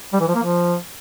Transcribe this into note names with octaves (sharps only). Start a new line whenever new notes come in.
G3
E3
F3
A#3
F3